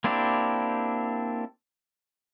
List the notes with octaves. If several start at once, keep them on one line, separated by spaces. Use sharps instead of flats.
A#3 C4 D4 E4 G4